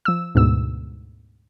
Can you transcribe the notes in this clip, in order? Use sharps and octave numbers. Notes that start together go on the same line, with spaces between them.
F3 E6
D2 G#2 B2 E6